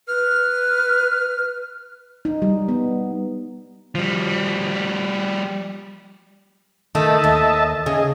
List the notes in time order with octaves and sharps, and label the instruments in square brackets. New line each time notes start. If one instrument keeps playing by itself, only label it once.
[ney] B4 [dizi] F6
[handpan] D#4
G3
B3
[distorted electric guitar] F3 G3
[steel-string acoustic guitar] D#3 A3 [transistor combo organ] D#5 E5 A5
[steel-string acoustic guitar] D#2
[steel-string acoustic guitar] C#3 [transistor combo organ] G#4 D#5